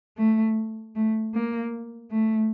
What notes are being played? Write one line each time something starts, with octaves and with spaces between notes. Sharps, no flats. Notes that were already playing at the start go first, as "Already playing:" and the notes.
A3
A3
A#3
A3